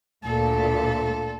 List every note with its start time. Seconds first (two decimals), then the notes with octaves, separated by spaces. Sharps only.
0.24 D2 A#2 A4